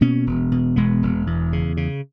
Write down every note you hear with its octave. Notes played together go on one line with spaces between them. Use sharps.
B2 A#3 C#4
E1
B2
E1 G#3 B3
E1
E2
C#3
C#3